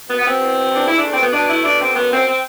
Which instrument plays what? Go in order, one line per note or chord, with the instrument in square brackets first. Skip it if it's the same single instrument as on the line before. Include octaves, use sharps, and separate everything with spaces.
[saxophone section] B2 B3
B3
B2 C4
E2
B2
E2 D4
E2 E4
A3 D4
C4
B2 B3
B2 D4
A3 E4
B2 D4
D3 C4
F#2 B3
F#2 C4
C4